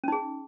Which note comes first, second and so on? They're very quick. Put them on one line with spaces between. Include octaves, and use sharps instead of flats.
C#4 D#4 G#4